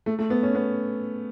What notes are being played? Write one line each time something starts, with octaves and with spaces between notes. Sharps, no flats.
A3
A3
B3
C#4
B3